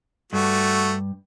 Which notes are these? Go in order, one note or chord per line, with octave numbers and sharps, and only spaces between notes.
G2 A3 F#4